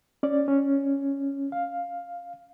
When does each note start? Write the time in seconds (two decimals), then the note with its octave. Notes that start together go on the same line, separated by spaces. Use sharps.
0.23 C#4 D5
0.48 C#4
1.52 F5